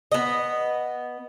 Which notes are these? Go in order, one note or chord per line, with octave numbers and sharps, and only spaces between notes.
B3 D#5